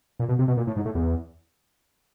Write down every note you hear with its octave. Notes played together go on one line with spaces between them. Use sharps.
A#2
B2
C3
B2
A#2
A2
G#2
A2
E2